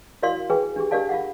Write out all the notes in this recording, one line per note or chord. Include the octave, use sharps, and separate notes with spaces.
E4 F#4 A#4 D5 F5 C6
G#4 B4 G5 G#5
D4 G4 G#4
D4 G4 A#4 D5 F5 A5
F4 F5 F#5